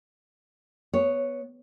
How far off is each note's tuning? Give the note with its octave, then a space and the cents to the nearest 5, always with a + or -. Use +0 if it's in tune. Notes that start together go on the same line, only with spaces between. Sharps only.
B3 +0 C#5 +5